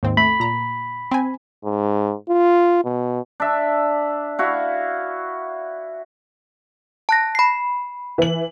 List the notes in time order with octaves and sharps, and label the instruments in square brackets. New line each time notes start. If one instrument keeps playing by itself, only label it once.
[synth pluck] D#2 G#2 C4
[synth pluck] A3 [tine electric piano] B5
[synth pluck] A#2 A#5
C4 G#5
[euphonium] G#2
F4
B2
[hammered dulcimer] D4 E5
E4 F#4 F5
[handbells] A5 F#6 A#6
B5 C7
[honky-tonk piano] E3 F#7